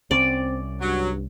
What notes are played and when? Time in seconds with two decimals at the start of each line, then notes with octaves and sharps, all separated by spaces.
0.11 C2 C4 C#4 D5
0.81 G2 F#3